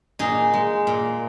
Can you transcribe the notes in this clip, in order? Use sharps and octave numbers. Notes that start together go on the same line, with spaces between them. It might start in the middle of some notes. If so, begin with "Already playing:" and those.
A#2 D#4 G#4
G#3
A#2